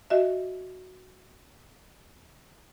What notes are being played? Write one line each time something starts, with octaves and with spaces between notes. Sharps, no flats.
F#4 D#5 E5